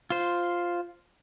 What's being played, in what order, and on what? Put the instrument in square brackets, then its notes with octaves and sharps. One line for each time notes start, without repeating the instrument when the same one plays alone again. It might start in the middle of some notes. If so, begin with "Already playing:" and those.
[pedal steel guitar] F4 C5